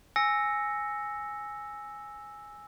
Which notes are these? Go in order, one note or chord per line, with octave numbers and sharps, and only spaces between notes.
G#5 E6 A#6 C#7